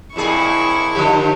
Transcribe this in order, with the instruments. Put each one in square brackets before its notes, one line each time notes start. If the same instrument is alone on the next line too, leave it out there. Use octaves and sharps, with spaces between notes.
[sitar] F2 A#2 G#4 [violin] E4 C#6
[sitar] D3 F3 G4